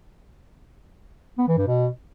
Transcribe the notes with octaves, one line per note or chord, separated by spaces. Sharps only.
B3
E3
G2
B2